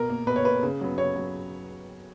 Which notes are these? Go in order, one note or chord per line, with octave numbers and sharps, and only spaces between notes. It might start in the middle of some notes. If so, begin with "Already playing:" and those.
Already playing: B2 A#4
A#3
B2 B4
C#5
A#3 B4
C#3
F#3 B3
C#3 C#5
F#3